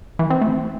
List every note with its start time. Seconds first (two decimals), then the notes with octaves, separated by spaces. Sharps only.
0.19 E3
0.30 C4
0.41 A3